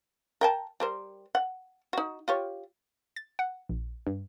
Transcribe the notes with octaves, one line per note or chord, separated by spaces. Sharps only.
A#4 G5 A5
G3 A#4 C5
F#5
D#4 F#4
F4 G4 C#5
A6
F#5
A#1
G2